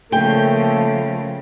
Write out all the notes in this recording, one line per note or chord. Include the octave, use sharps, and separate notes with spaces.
C#3 F3 A3 A#3 A4 G5